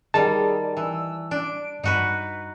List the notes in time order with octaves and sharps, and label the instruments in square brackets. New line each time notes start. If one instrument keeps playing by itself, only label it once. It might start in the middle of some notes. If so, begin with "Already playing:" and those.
[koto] D#3 G3 [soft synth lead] G#4 [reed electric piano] A5
[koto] E3 [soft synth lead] E6
[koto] D4 [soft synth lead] D7
[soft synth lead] G2 [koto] D#4 F#4 B4